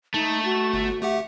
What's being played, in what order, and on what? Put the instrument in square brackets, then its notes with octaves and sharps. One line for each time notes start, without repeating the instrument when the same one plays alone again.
[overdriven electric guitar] A3 [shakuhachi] D#4
[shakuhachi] F#4 [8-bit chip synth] A6
[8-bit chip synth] G1
[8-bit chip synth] A3 G4 F#5 [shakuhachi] E5